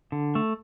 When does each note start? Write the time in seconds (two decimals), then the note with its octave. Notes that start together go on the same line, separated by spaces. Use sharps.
0.12 D3
0.35 A3